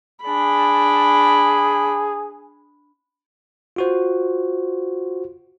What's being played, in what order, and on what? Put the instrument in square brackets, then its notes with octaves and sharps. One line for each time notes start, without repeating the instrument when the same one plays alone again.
[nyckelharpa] D4 B5 [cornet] G#4
[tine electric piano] F4 F#4 C5